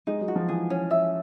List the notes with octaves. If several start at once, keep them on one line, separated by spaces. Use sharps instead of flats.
G#3 D#4
F#3
F#4
F3
E3 G#4
C#4
E5